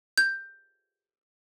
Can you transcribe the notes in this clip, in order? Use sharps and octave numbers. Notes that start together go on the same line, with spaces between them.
G6